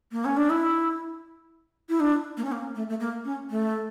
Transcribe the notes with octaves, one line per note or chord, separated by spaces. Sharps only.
A#3
C#4
D4
E4
E4
D4
A#3
C#4
A#3
A3
A3
A#3
C#4
A3